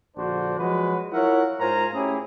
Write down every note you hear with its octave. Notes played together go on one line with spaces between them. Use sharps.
A#1 D3 D4 F#4 C5
F3 F#3 G#3 F#4 B4
E4 F4 A#4 C#5 E5 F#5
G#2 F4 A#4 C5 G#5 A#5
A3 C#4 E4 G4 G#4